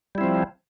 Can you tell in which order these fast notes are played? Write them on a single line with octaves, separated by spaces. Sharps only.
G3 E4 C4 F3